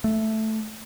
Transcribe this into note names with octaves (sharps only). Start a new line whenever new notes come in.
A3